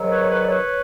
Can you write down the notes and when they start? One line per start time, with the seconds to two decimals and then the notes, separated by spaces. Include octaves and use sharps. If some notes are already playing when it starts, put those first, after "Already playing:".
Already playing: G#2 D#3 F#3
0.09 B4 C#5
0.29 B4 C#5
0.43 D5
0.48 B4 C#5